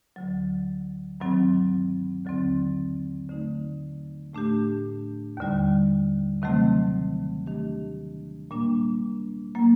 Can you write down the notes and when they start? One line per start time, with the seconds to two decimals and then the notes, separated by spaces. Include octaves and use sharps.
0.16 D2 D3 F#3
1.20 G2 D#3 F#3 C4
2.25 D#2 D3 F#3 C4
3.29 D3 A3 D#4
4.33 A2 A3 D4 G4
5.37 D#2 D3 G3
6.42 C3 D#3 F#3 A3 C4
7.47 D#3 A3 D4 G4
8.51 A#2 G3 A#3 D4
9.55 F#3 A#3